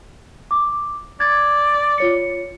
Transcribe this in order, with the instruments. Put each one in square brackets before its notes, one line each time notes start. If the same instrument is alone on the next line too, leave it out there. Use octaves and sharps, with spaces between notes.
[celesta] D6
[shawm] D5 [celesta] G#6 A6
[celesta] F4 C#5 C#7